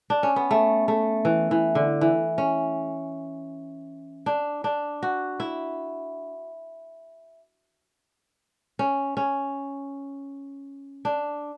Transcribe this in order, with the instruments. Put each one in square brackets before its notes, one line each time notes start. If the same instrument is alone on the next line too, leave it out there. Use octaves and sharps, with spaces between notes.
[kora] D4
C#4
B3
A3
A3
E3
E3
D3
E3
C#4
D4
D4
F#4
E4
C#4
C#4
D4